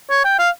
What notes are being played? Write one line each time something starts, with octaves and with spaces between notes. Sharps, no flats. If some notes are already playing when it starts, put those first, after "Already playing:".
C#5
G5
F5